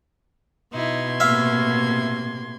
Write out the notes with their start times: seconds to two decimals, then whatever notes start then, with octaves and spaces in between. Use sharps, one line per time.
0.73 B2 D#4 E4 C6 G#6
1.20 A2 C3 A#3 E5 F5